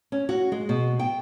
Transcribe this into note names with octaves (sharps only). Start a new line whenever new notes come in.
C#4
F#4
G#3
B2
G5